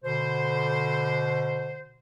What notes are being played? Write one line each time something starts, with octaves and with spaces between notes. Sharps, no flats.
B2 D3 C5